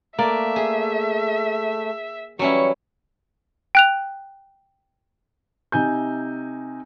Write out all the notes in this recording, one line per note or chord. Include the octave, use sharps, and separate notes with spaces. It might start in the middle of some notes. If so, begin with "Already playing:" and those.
A3 A#3 D5 E5
G#4
E3 F#3 G3 C#4 E4 C#6
G5 F#6 F7
C3 D#4 G#5 G6